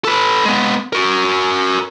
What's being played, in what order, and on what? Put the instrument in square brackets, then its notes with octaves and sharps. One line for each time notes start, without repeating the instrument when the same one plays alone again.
[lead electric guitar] A4 B4
G#3 B3
F#4 A#4